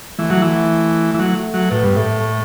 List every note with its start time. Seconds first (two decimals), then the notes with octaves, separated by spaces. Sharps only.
0.19 E3 A3
0.30 F#3
0.42 E3
1.15 E3
1.19 F#3
1.54 F#3
1.70 A2 B3
1.84 G2
1.96 A2 A3
2.20 A3